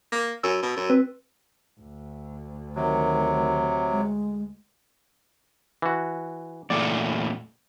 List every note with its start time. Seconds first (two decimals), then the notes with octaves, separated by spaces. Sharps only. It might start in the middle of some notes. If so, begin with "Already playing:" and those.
0.12 A#3
0.43 F#2 E6
0.63 B2
0.77 F#2
0.90 C4 B4
1.80 D2
2.76 C3 D#3 F#3
3.91 G#3
5.82 E3 F#4
6.70 E2 A#2 A3 D5